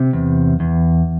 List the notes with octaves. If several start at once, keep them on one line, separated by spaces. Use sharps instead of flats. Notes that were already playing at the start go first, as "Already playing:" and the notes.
Already playing: C3
E2
E2